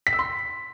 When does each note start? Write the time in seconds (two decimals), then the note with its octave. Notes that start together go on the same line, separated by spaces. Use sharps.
0.07 B6
0.13 E6
0.19 C6